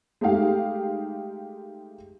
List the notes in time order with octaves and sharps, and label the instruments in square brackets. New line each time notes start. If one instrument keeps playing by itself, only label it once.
[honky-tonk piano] G#3 A3 D#4 G4 F5